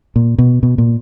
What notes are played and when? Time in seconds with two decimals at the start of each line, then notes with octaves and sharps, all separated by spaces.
0.16 A#2
0.38 B2
0.63 B2
0.78 A#2